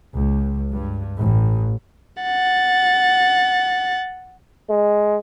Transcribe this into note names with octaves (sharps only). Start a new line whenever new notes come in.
C#2
G2
A1
F#5 A6
G#3